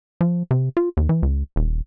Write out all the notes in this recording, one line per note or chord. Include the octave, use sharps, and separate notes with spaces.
F3
C3
F4
D#2
E3
C#2
D#1